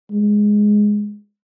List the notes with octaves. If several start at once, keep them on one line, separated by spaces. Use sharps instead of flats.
G#3